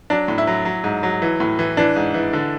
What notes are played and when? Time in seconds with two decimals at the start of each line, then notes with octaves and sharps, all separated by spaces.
0.10 F#3 D4
0.28 A2
0.38 E4
0.47 F#3
0.65 F#3
0.84 G#2
1.03 F#3
1.22 E3
1.40 A2
1.59 E3
1.77 E3 D4
1.96 G#2
2.14 E3
2.33 D3